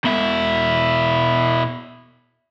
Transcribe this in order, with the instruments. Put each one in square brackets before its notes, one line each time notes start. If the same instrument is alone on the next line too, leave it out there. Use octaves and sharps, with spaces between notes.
[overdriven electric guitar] B2 E4